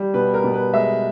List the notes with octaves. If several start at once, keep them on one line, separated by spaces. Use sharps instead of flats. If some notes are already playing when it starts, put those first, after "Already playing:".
Already playing: G3
B2 B4
A#4
B2
B4
G#3 E5